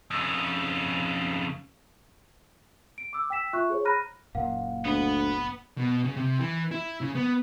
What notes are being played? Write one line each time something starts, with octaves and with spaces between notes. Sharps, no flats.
F2 C#3
D7
D6 E6
G5 E6 B6 E7
F4 E5 C#6 F#6
G#4 C5 C#5
A#5 B5 F6 F#6 A#6 D#7
F#1 A#2 A#3 F5 F#5
D2 B3
B2
C#3
C3
E3
E4
C#3
B3